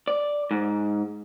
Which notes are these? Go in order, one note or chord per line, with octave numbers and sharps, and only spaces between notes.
D5
G#2